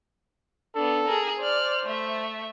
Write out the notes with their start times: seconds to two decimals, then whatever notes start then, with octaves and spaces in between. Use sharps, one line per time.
0.75 B3 D4 A4
1.06 G#4 A#4
1.40 C5 D5 F6
1.85 A3 E5